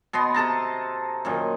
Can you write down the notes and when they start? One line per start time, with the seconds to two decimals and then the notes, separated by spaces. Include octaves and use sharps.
0.13 B2 B3 D#5 C6
0.34 C3 A4 A5 A#5
1.25 F#2 A#2 D#3